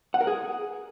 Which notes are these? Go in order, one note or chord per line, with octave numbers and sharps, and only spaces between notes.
F#5
A#4
G#4